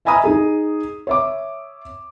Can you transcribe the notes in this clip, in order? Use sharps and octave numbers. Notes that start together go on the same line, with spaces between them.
D#5 E5 G#5 A#5 B5 D#6
D#4 G#4
C#5 E5 D6